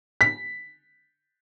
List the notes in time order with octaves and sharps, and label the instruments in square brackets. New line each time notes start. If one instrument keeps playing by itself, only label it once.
[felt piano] B6